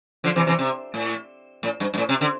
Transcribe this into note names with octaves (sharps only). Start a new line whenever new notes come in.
D3 F3
C3 E3
C3 E3
C3
A2
A2
G2
G2
A2
C3
D3